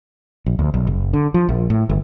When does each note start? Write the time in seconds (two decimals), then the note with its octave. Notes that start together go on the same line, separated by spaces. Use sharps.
0.46 A#1
0.59 D2
0.74 B1
0.87 F#1
1.13 D3
1.34 F3
1.49 A#1
1.70 A2
1.89 G1